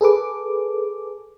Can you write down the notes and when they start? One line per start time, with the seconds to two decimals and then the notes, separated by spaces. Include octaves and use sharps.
0.01 G#4 A4 B4 D6